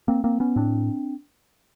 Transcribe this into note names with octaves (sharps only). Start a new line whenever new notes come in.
A#3 C4
A#3 C4
B3 C#4
A2 C4 D4